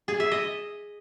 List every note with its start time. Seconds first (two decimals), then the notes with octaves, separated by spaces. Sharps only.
0.08 G#4
0.20 E5
0.32 D#5